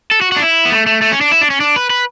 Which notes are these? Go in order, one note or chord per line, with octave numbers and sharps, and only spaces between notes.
A4
F#4
F#4
D4
E4
B3
A3
A3
A3
C#4
D4
E4
D4
C#4
D4
B4
B4